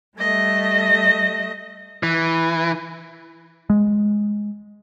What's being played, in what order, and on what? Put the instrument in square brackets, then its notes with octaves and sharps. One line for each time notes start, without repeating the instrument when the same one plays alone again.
[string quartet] G3 A3 D#5
[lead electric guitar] E3
[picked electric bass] G#3